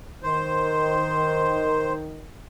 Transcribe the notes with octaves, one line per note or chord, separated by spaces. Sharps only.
D#3 C5